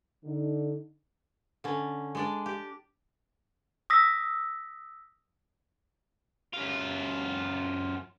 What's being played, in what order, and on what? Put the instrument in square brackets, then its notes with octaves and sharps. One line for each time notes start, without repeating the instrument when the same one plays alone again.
[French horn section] D3 D#4
[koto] D3 C#4
G#3 D4 D5
G4
[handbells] D#6 E6 A#6 B6
[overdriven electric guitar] F#2 F4